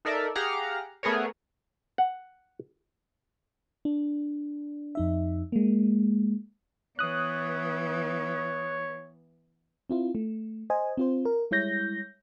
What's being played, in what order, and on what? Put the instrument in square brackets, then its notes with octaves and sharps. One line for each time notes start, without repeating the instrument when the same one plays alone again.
[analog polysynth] D#4 A4 A#4 D5 E5
G4 G#4 F5 F#5 A#5 F6
A3 B3 G#4 A#4 C#5
[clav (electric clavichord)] F#5
[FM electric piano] D4
F2 D#4 E5
G#3 A#3
[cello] E3 B3 [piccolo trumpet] C#5 [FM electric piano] D#6 F#6
[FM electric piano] C4 E4 F4
A3
C5 D#5 G#5
C4 F4 C5
A#4
G3 G#3 E4 C#5 G6 A#6